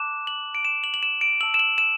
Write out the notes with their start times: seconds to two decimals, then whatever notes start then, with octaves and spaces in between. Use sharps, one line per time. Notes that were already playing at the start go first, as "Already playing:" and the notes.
Already playing: A5 D6 F#6 E7
0.27 F#7
0.55 D7
0.65 E7
0.84 F#7
0.94 F#7
1.03 E7
1.21 D7
1.41 A5 E6 F#7
1.54 E7
1.59 F#7
1.78 E7